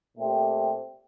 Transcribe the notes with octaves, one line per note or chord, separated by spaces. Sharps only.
A#2 A3 C4 G4